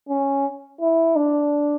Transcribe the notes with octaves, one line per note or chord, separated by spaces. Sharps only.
C#4
E4
D4